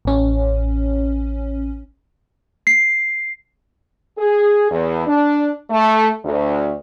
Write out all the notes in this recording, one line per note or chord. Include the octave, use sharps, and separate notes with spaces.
A1 C#4
C7
G#4
E2
D4
A3
D2